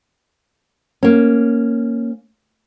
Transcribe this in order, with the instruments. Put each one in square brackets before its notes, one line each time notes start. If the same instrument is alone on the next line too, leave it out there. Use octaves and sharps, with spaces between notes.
[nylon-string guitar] A#3 C#4